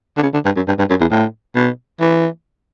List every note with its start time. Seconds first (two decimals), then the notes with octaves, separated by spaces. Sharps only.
0.17 D3
0.23 C#3
0.34 D3
0.45 G2
0.56 F#2
0.68 G2
0.79 G2
0.90 F#2
1.00 E2
1.11 A2
1.55 B2
2.00 E3